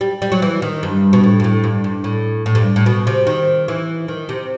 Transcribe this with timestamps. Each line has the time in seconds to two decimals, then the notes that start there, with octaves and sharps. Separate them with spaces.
0.01 G3
0.22 G3
0.32 F#3
0.42 E3
0.62 D#3
0.83 G2
1.13 B2
1.24 A2
1.40 G2
1.44 A2
1.64 G2
1.84 G2
2.04 A2
2.46 A2
2.55 G2
2.76 A2
2.86 B2
3.07 C3
3.27 D#3
3.68 E3
4.08 D#3
4.29 C3